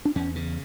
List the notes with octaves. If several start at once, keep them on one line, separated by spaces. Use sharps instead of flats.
D4
E2 C#4
C#3